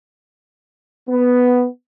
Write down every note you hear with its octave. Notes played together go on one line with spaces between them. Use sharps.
B3